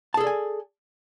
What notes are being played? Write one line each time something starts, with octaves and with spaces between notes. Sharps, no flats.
G#4 A4 D5 G#5 A5